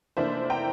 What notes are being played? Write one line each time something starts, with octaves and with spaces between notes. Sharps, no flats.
F1 F2 E3 A#3 D4 C5 E5
G5 A#5